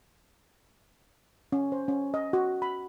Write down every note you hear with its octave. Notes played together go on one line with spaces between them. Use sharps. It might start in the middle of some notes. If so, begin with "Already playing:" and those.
C#4
C5
C#4
D#5
F#4
B5